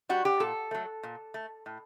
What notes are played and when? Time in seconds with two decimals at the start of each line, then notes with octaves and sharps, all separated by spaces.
0.09 G3 F#4
0.25 G4
0.40 A#2 A4
0.71 F#3 A3
1.03 A#2
1.34 A3
1.66 A2